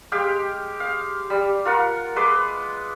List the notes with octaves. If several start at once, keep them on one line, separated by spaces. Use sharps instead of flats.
G#3 G4 F5 G5
F5
G3
F4 A#4 F#5
G#3 B4 C6 D6